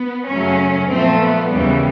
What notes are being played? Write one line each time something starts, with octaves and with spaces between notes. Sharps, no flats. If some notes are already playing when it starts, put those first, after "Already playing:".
Already playing: B3
F#2 C#3 F#3 A3 C#4
A#2 F3 A3 C4
B3
D#2 C#3 E3 G3